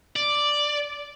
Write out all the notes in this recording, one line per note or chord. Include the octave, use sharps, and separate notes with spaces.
D5